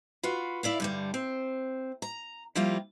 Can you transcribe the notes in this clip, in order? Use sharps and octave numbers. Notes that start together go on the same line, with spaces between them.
F4 F#4 B4
E4 D5 E5 F5
G2 D3 G3
C4
A#5
F3 G3 A#3 E4 F4 G4